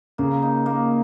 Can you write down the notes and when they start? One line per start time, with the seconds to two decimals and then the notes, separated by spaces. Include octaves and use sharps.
0.18 C#3 A#3
0.42 D#4
0.66 A#3